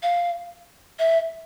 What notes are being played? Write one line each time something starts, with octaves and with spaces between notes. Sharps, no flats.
F5
E5